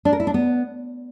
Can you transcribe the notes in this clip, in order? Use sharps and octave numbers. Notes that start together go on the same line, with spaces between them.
D4
A#4
E4
D4
B3